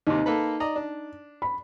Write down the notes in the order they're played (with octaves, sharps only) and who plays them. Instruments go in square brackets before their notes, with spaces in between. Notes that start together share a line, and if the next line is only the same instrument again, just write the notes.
[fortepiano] D#2 C3 [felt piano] D#4
[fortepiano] A#3 A4 B4
D5 D#5 A#5
D4
[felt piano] B5